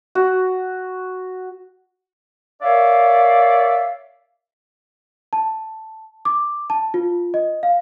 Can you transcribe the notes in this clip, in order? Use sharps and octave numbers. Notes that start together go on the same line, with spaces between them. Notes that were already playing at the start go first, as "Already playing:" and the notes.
F#4
A#4 C#5 D5 E5 F5
A5
D6
A5
F4
D#5
F5